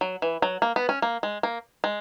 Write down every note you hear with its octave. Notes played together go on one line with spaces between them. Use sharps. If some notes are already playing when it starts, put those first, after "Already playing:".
F#3
E3
F#3
A#3
B3
C#4
A#3
G#3
A#3
G#3